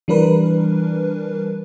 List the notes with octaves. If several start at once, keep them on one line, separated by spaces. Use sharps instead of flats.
E3 G3 D4 A#4 B4